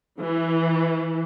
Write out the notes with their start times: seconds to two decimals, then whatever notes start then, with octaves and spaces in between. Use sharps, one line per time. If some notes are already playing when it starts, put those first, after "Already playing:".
0.22 E3